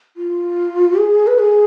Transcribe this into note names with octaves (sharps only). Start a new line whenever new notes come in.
F4
G#4
B4
G#4